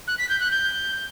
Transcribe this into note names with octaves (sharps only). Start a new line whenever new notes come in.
F#6
B6
G6
F#6
G6